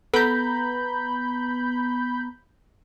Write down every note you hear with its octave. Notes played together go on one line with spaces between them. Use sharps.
B3 A4 B4 A#5 B5 G6 D7